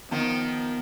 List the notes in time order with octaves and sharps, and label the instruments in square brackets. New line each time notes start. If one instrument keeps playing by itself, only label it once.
[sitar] D#3 F3 [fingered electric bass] B3